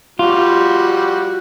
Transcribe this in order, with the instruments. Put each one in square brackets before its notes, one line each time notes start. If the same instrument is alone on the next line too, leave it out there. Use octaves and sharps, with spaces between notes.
[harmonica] G3 F#4 [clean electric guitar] F4